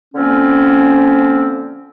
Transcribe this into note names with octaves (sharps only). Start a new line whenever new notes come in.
D3 F3 A#3 C4 C#4